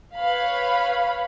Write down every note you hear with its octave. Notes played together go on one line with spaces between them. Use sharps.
B4 C#5 F5 B5